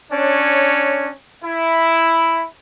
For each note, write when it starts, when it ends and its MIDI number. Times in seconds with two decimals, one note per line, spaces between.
0.12 1.11 61
0.12 1.11 62
0.12 1.11 73
1.44 2.43 64